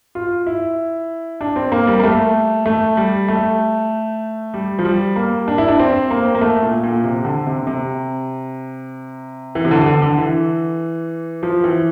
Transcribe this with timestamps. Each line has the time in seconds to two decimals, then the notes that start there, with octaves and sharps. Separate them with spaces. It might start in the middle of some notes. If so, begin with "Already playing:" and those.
0.15 F4
0.47 E4
1.41 D4
1.56 C4
1.72 A#3
1.87 G3
1.99 A#3
2.03 A3
2.66 A3
2.97 G3
3.28 A3
4.54 G3
4.79 F3
4.85 G3
5.16 A#3
5.48 D4
5.58 E4
5.68 D4
5.79 C4
6.11 A#3
6.35 A#3
6.41 A3
6.63 A#2
6.83 A#2
7.04 C3
7.25 D3
7.46 C3
7.67 C3
9.55 E3
9.65 C3
9.71 D3
9.86 D3
10.02 D3
10.18 E3
11.43 F3
11.64 E3